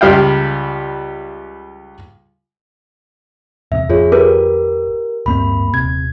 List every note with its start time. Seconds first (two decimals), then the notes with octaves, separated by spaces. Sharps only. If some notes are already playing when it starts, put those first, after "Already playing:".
0.01 C#2 G3 F5 G5
3.72 E2 G#2 C3 E5
3.89 G#1 F2 F4 G#4 C#5
4.12 G4 A#4 B4
5.26 D1 G2 A#3 C4 B5
5.74 D#1 C3 G#6